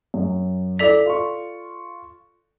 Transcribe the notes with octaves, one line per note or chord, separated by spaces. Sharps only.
F#2
E4 A4 D5 D6 B6 F7
F4 C6 C#6